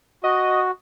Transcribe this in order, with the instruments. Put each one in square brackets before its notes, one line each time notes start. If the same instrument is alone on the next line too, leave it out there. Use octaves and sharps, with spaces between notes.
[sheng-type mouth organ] F#4 [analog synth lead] D#5